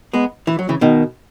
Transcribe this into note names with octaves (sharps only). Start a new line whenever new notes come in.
G#3 B3
E3
F#3
C#3 E3
B2 D#3